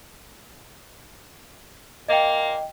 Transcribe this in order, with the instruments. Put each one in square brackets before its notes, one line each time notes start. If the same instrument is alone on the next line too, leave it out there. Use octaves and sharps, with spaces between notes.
[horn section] A#2 A#3 [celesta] D#5 G5